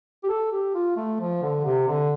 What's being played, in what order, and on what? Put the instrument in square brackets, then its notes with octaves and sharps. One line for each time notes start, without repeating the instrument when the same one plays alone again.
[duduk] G4
A4
G4
F4
A3
F3
D3
C3
D3